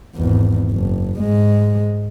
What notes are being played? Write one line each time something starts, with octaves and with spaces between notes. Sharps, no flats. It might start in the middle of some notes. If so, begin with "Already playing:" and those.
G#1 E2
F#1
G#2 G#3